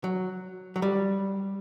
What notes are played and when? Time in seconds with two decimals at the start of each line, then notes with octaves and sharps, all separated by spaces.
0.04 F#3
0.76 F#3
0.82 G3